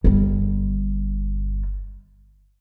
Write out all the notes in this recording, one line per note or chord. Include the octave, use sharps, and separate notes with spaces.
G1 G3